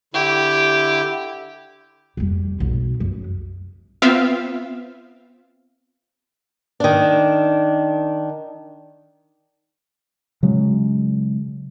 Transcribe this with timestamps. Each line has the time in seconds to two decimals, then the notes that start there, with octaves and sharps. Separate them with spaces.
0.14 D3 E4 G4
2.17 F2 G3
2.60 B1
3.00 F#2
4.02 B3 C4 F4 E5 F5
6.80 D#3 D4
10.43 C#3 F#3 G#3